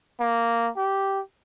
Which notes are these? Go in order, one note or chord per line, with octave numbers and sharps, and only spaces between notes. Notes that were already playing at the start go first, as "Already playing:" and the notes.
A#3
G4